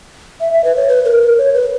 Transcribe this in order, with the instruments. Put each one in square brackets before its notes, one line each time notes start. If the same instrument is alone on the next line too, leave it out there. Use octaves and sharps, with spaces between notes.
[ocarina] E5
E5
B4
C#5
B4
A#4
A#4
C#5
B4